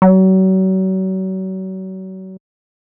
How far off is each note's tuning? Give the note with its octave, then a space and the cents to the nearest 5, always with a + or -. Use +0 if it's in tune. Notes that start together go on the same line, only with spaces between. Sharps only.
F#3 +35